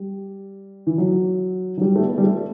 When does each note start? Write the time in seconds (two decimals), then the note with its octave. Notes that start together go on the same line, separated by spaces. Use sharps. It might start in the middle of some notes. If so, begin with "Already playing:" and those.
Already playing: G3
0.87 E3
0.98 F#3
1.78 F#3
1.81 G3
1.96 A3
2.02 B3
2.18 G3
2.23 A3